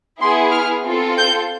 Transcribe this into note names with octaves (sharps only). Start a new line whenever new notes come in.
B3 E4 G#4 C6
F6
C4 F4 A4
G6